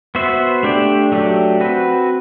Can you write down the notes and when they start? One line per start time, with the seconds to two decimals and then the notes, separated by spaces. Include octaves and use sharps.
0.15 B3 F#4 C5 E5
0.63 A3 D4 G4 D5
1.12 F#3 A3 D4 G4
1.60 C4 F#4 B4